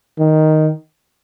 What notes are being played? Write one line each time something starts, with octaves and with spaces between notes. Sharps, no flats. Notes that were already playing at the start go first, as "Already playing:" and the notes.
D#3